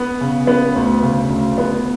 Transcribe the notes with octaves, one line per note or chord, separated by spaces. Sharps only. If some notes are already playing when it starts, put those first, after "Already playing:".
Already playing: B3
C#3
B3
D2
C#3
D2
B3